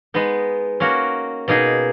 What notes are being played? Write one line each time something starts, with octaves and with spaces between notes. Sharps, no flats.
G#3 B3 D#4
A#3 C#4 F#4 A#4
B2 A#3 D#4 G#4